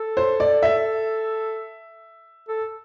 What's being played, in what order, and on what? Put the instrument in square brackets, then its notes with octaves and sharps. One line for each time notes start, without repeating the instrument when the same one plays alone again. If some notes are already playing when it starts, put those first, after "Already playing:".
Already playing: [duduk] A4
[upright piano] C5
D5
E5
[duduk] A4